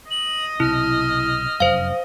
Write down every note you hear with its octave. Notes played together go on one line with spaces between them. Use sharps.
D#5 F#7
B1 C3 E4 F6
F1 F#2 C5 F5